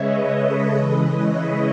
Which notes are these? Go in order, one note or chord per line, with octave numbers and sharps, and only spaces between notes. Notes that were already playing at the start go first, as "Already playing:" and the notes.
Already playing: C#3 G#3 B4 C#5 D#5 E5
A4 C#5
C#3 E3 G#3 B4 D#5
C#5 E5